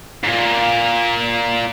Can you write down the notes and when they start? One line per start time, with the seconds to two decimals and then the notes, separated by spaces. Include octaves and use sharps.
0.24 G#2
0.27 A#2